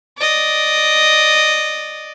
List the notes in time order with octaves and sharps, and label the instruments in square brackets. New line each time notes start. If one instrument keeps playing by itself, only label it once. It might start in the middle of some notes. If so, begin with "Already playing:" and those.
[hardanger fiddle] D5 D#5